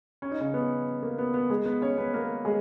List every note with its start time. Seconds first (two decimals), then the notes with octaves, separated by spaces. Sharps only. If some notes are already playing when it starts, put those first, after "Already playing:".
0.22 C#4
0.31 D#4
0.41 C#3 C#4
0.54 B3
1.03 A#3
1.18 B3
1.34 B3
1.50 G#3 G#4
1.66 B3 B4
1.82 C#4 C#5
1.98 B3 B4
2.14 A#3 A#4
2.45 G#3 G#4